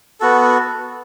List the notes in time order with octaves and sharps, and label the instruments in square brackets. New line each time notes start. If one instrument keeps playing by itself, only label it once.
[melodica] B3 F#4 A4